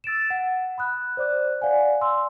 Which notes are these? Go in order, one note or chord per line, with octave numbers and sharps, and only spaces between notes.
E6 A6 D7 E7
F#5
B5 D#6 F#6
C5 D5 D6 F#6
D5 F5 F#5 G#5
C6 E6